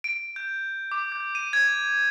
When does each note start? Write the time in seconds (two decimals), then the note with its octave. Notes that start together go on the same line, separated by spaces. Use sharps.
0.04 D7
0.36 G6
0.92 D6
1.12 G6
1.35 D#7
1.53 G#6